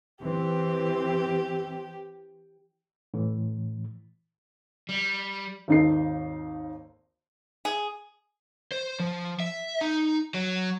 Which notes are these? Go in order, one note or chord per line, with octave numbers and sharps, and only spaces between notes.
E3 C4 G4
A2 E3
G3
G#1 D#2 D#4 A4 C7
G#4
C5
F3
E5
D#4
F#3